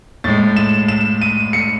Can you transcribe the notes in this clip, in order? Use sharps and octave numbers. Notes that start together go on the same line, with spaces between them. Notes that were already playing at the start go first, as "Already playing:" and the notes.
A2 G#3 A6
E7
E7
D#7
C#7